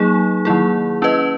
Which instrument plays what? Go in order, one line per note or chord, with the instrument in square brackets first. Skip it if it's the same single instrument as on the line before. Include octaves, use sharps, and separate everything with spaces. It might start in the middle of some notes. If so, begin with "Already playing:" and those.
Already playing: [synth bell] F#3 A#3 D#4 G#4
D#3 F#3 A#3 E4 G#4
C#4 E4 B4 D#5